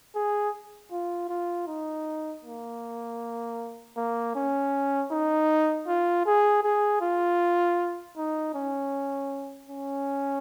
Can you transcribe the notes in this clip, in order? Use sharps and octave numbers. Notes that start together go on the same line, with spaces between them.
G#4
F4
F4
D#4
A#3
A#3
C#4
D#4
F4
G#4
G#4
F4
D#4
C#4
C#4